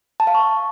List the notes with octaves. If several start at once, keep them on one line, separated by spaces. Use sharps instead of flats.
A5
F5
C#6